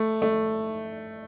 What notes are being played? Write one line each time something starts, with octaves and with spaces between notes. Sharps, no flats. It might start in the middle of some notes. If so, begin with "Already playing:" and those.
Already playing: A3
A3